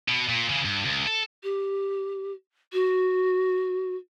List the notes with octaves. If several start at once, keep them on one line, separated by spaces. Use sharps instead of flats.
B2
A#2
C#3 E3
G2
C#2
A4
G4
F#4